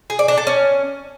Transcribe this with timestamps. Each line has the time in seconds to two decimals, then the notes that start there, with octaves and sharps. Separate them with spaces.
0.10 G#4
0.19 D5
0.28 D4
0.38 A4
0.47 C#4